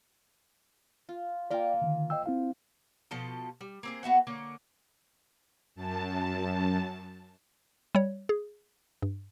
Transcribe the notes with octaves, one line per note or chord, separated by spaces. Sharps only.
F4
A#3 F4 A#4 D5 G5
D3 D#3
C5 D#5 G5 E6
C4 E4 F5
B2 F3 A4 D#5
G3
A#3 C4 G#4
B3 F#4 E5 F#5
D3 A#3 C#5
F#2 A5
G3 C#5
G#4
G2